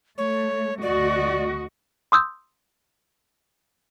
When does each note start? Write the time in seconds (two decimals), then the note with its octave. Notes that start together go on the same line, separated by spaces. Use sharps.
0.18 A3 C#5
0.82 D2 F#4 D5 D#5
2.12 C6 D#6 E6 G6